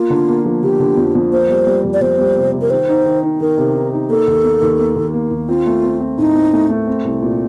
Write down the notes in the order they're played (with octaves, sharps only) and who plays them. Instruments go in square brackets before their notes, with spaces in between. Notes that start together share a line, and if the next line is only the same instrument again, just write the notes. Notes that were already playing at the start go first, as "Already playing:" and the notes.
Already playing: [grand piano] A#3 [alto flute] F4
[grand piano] D3
A#3
F3
[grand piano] D3 [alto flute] G4
[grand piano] D3
F2
F2
[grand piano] A#3 [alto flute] C5
[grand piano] G3
G3
F2
[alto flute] D5
[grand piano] F2 [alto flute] C5
[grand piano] G3
C3
C3
[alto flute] A#4
[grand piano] D#3 [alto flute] C5
[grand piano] D#4
D#3
D#4
[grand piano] D#3 [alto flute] A#4
[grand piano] C3
D#4
D#4
[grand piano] A#3 [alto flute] A4
[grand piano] D#2
A#3
D#2
A#3
D#2
A#3
D#2
[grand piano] C4 [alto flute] F4
[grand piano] A3
C4
C4
[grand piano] A2 [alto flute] D#4
[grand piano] C4
A3
A3
C4
C2
A#2